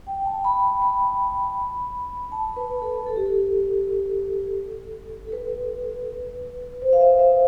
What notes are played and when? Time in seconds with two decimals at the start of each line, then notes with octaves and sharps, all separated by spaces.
0.07 G5
0.25 A5
0.44 B5
0.82 B5
2.32 A5
2.56 B4
2.82 A4
3.06 A4
3.16 G4
3.26 A4
5.27 A4
5.32 B4
6.82 C5
6.93 F5
7.01 E5
7.19 E5